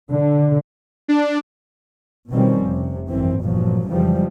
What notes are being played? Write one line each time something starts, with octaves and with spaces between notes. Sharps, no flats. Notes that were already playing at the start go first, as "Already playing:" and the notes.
D3
D4
B2 D#3 F3 G3 C4 C#4
F1 C3
G#1 F#2 E3 C4
G1 E2 A#2 F3 F#3
F2 C#3 E3 F3 G3 G#3